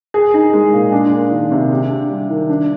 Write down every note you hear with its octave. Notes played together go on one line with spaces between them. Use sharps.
G#4
D#4
G#3
A#2
D4
A#3
D#3
C3
G4
D4
G3
D#3
D4